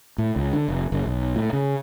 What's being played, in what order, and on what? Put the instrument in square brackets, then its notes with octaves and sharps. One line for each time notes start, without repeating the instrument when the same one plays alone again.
[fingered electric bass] A2
C#2
D3
F1
F#1
B1
A2
C#3